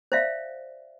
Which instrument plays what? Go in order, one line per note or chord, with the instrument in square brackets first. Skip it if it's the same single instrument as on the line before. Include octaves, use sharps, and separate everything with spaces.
[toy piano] C5 D5 E5 F5